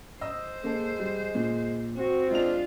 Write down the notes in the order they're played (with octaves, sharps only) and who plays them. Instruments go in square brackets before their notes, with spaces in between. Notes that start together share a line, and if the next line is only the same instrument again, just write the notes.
[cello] C5 [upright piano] D#5 E6
[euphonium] G#3 [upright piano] A#3 A4
[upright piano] G3
A#2
[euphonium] C4 [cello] F#4
[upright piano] G#3 D#5 F7 [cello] D4 F4